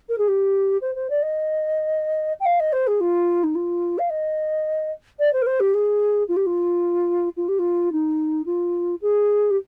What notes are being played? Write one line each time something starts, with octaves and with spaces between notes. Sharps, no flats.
A#4
G#4
G4
C5
C5
D5
D#5
G5
F5
D#5
C5
G#4
F4
D#4
F4
F5
D#5
D5
C5
A#4
C5
G4
G#4
F4
G4
F4
F4
G4
F4
D#4
F4
G#4
G4